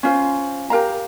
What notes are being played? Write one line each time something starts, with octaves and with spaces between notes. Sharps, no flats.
C#4 F4 C5
G4 A#4 F5 A#5